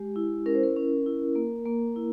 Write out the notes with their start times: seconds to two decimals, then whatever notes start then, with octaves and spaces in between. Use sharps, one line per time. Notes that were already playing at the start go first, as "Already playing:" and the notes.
Already playing: G#3 G4
0.16 E4
0.46 C#4 A#4
0.55 C5
0.63 A#4
0.76 C#4
1.06 E4
1.35 A#3
1.66 A#3
1.96 E4